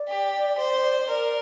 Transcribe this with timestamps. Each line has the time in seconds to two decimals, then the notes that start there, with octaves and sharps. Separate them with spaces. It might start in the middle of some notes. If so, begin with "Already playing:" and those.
Already playing: D5
0.08 G4
0.58 C5
1.09 A#4 D5